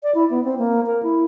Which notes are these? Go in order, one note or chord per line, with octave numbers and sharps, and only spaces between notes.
D5
E4
B3
C4
A#3
A#4
E4